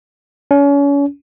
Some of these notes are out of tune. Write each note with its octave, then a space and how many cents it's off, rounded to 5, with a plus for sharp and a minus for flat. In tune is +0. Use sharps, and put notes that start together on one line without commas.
C#4 +35